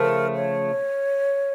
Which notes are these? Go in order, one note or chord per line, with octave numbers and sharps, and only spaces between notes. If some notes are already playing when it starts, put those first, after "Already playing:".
Already playing: C#3 F3 A3 A#4
C#5